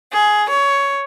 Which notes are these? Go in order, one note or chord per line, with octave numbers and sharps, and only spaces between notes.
G#4
C#5